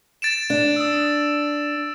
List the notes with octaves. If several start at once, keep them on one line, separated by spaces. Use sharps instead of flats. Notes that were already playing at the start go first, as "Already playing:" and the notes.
A6 D7 E7
D4
D#6 E6